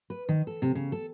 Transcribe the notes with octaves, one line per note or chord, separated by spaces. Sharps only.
B4
D#3
A4
C3
C#3
A4